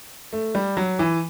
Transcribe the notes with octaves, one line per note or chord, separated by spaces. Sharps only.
A3
G3
F#3
E3